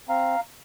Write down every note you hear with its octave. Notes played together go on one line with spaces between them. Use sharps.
C4 F5 A#5